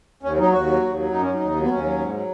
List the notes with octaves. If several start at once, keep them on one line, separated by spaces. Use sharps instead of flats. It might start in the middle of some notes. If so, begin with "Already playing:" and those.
D#2 C#4
F#3 D#4
D#2 F#4
F#3
D#2
F#3
F#2 D#4
F#3 C#4
D#4
D#2
F#3
B3
D#2 C#4
F#3
G#2
F#3